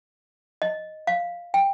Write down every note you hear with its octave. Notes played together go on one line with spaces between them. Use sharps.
D#5
F5
G5